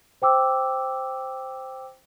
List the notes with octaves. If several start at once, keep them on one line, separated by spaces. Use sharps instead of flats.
C5 G5 D6 E6